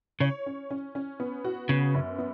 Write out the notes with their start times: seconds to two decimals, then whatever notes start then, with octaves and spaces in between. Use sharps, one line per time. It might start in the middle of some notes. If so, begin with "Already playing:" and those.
0.20 C#3 C#5
0.46 C#4
0.71 C#4
0.95 C#4
1.20 B3
1.44 F#4
1.69 C#3 B3
1.95 F#2
2.18 B3